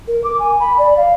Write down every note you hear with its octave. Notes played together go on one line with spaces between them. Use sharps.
A#4
D6
G#5
B5
D5
F5